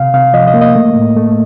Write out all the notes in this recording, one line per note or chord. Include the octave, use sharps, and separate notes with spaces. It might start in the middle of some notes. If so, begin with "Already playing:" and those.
Already playing: C3 F5
C3 F5
F3 D#5
D#5
A#3
D#5
A3
A2
A3